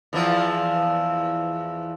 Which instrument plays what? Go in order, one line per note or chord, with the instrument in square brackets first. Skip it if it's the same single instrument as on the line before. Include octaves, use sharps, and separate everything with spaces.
[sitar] E2 E3 F3